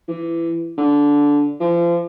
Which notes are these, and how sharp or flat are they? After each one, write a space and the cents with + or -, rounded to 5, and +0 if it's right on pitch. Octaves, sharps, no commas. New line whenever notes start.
E3 +20
D3 -15
F3 -35